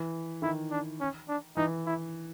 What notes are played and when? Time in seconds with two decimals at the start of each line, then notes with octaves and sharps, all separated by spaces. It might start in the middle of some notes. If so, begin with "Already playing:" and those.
Already playing: E3
0.42 D#3 E4
0.71 D4
1.00 C#4
1.28 D4
1.57 E3 D#4
1.86 E4